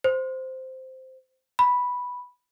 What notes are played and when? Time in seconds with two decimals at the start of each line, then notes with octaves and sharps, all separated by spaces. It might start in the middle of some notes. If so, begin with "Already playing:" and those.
0.04 C5
1.59 B5